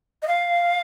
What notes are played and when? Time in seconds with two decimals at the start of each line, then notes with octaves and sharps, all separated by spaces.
0.22 D#5
0.27 F5